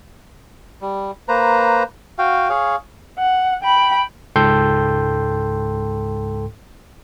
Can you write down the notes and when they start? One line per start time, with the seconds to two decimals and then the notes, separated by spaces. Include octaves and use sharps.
0.81 G3
1.28 A#3 B4 C5 A#5
2.18 F#4 F5 G5
2.49 G#4 C#5 F5
3.19 F#5
3.63 G5 B5
4.36 C#2 G#2 A4 G5 C6 G6